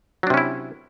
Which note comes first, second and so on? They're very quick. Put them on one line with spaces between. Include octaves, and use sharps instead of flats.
F#3 D4 C3 C#4 E4